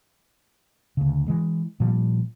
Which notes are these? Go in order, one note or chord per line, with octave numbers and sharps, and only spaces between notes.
D2 C#3
E3 G#3
A#2 F3 G3